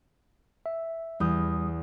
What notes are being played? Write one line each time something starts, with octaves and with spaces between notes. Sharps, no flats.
E5
E2 G3 D#6 G6